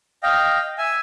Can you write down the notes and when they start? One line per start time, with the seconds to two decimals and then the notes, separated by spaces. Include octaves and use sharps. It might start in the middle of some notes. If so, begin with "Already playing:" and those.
0.23 D#5 F5 G5
0.78 E5 G#5